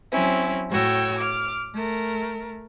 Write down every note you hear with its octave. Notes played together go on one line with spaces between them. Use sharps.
F#3 C4 C#4 E4
A2 F#4 C#5 G5 E6
D6 F6
A3 A#4